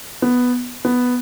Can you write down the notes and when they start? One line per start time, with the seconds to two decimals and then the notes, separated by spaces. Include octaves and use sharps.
0.22 B3
0.85 B3